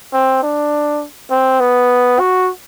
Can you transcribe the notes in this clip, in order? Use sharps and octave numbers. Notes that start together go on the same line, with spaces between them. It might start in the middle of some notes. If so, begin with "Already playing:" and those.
C4
D4
C4
B3
F#4